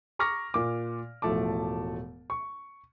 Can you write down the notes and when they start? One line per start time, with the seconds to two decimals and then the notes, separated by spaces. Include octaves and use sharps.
0.19 A#5 C#6 D6 F6 A#6
0.54 A#2 D6
1.22 E1 A2 F3 A3 A5 D6
2.30 C#6